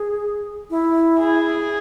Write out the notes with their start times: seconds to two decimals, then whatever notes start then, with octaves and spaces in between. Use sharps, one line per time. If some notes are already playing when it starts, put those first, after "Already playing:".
Already playing: G#4
0.70 E4
1.20 G#4